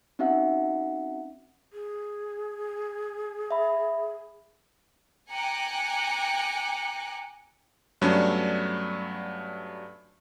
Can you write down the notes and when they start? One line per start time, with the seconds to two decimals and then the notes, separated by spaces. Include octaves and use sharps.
0.19 C4 C#4 D#4 F#4 E5 F#5
1.73 G#4
3.51 E5 B5
5.31 G5 G#5 A#5 D6 F#6 C#7
8.02 G2 F#3 A3 B3 C#4 D4